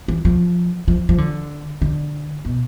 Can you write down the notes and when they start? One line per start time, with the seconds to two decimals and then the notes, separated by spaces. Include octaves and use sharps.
0.08 E3
0.25 F3
0.88 F3
1.09 F3
1.18 D3
1.82 D3
2.45 B2